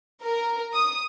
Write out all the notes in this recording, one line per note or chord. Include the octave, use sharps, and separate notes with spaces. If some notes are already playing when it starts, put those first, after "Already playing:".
A#4
D#6